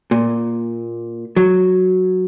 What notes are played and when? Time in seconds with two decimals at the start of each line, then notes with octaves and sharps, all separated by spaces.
0.11 A#2
1.37 F#3